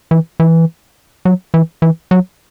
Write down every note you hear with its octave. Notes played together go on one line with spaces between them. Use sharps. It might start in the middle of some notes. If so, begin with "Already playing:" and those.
E3
E3
F#3
E3
E3
F#3